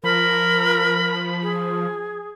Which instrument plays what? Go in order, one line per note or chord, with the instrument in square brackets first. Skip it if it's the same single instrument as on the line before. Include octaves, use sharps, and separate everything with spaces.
[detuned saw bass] F3 [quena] A#4 [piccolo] B5
[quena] G#4